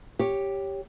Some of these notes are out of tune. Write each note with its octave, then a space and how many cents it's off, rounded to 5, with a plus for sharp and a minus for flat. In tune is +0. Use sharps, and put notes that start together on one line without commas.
G4 +0 C#5 +0